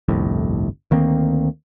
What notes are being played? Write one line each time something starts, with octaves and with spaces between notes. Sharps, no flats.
G1 C2 F2 A2
D2 D#3 A#3 C4